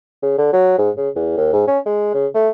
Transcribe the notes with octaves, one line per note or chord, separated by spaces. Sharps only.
C#3
D3
F#3
G#2
C#3
E2
D#2
G#2
C#4
G#3
C#3
A3